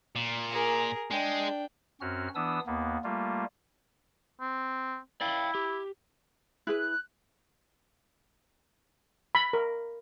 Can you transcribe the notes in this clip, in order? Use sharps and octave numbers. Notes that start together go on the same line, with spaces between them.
A#2
G#4 A#4
G#3 D4 G5
F#2 C4 C#4 F#4 F6
E3 B3 D4 D#6 E6
D#2 A#3 B3
G3 A3 A#3 F4
C4
E4 D5 F5 G5
G4
E4 G#4 B4 F#6
B5
A#4